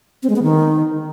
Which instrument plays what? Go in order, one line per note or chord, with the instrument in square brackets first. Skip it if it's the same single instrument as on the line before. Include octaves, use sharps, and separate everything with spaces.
[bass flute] C4
G#3
B3
D#3